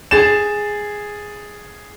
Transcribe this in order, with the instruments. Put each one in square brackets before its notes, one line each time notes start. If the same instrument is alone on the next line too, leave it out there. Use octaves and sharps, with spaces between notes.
[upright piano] G#4 A6 E7